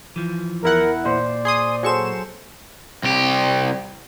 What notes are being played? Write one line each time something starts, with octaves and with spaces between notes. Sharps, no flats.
E3 F3
E2 E4 A#4 F#5
A#2 C5 D5
G#4 C6 D#6
F#3 G#4 A4 C5 C#6 E7
C2 G4